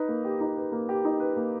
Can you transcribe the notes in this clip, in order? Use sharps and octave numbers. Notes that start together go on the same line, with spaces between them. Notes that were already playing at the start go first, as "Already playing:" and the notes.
Already playing: D#4 B4
A#3
G4
D#4
B4
A#3
G4
D#4
B4
A#3